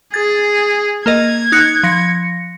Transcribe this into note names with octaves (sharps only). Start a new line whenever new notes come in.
G#4 G#6 A6
A#3 A#4 D#5 G#6
D#4 F#6 C#7
F3 A#6 C#7